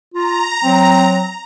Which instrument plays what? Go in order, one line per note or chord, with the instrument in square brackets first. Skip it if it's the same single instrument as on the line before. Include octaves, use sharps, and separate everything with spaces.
[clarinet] F4 [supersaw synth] A#5
[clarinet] F#3 [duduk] C4